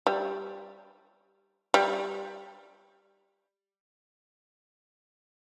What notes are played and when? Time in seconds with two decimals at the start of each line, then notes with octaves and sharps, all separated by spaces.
0.07 G3
1.74 G3